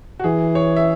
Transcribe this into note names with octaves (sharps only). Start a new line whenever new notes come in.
F#4
E3 G#4
C#5
E5